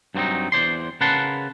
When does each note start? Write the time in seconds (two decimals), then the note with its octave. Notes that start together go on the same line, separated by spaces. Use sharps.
0.15 G2 F#3 B3 C4 D#4
0.52 E2 C5 D5 C6
1.01 C#3 A#4 B4 F#5 A5 C6